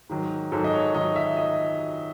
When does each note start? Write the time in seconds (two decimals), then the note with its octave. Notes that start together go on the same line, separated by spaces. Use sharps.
0.09 G#2 D#3 F#3
0.52 G#2 D#3 F#3 A4
0.64 D#5
0.73 C#5
0.94 G#2 D#3 F#3 D#5
1.16 E5
1.37 D#5